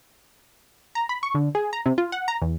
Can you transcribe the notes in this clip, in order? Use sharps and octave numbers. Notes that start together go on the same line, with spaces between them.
A#5
B5
C#6
D3
G#4
A#5
C3
F4
F#5
A#5
E2